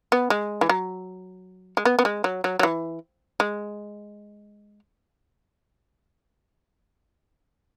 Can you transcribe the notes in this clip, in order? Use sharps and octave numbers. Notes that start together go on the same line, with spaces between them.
B3
G#3
E3
F#3
G#3
B3
B3
G#3
F#3
F#3
F#3
E3
G#3